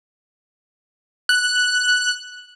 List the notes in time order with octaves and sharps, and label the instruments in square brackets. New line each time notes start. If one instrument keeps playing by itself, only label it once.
[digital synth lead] F#6